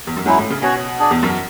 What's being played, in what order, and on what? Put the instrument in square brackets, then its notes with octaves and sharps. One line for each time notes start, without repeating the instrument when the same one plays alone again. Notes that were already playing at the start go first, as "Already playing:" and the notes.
[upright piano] E2
F#2
[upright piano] G#2 [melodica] F#3 C#4 E4
[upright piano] A2
C#3
[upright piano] B2 [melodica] C#4 F#4 C#5
[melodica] D4 G#4 D5
[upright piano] E2
F#2